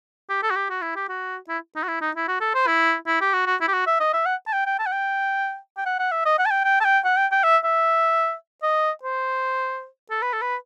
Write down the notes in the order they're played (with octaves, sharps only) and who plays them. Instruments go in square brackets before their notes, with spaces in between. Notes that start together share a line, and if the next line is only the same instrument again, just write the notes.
[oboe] G4
A4
F#4
G4
F#4
E4
G4
F#4
E4
D#4
F#4
E4
D#4
E4
F#4
A4
C5
E4
E4
G4
F#4
F#4
E4
G4
F#4
E5
D#5
E5
F#5
A5
G5
G5
A5
F#5
G5
G5
F#5
F#5
E5
D#5
F#5
A5
G5
G5
A5
G5
F#5
G5
G5
E5
E5
D#5
C5
A4
B4
A4
B4